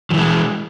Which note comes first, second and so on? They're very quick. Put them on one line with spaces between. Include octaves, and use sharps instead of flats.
F3 E3 G#3